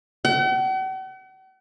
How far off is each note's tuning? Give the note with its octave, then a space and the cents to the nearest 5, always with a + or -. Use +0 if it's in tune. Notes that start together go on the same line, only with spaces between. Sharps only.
F#5 +45